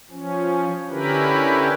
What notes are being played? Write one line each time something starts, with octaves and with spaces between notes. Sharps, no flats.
F3 C#4
D3 C#4 E4 G4 A#4 B4